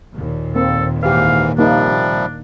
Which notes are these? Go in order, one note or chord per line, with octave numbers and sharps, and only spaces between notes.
D#2 A#2
A#3 C4 A4
G#2 E3 G4 B4 F5
C3 F3 G3 A#3 D4 D#4